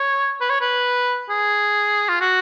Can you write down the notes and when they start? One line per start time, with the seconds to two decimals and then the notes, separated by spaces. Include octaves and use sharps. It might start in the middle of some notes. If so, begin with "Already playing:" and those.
Already playing: C#5
0.40 B4
0.50 C#5
0.61 B4
1.29 G#4
2.09 F4
2.20 F#4